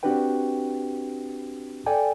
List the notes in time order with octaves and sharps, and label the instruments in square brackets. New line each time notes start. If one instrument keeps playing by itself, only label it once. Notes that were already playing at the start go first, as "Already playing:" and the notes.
[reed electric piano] C4 D4 F#4 G4 B4 G5
A4 D5 G5 G#5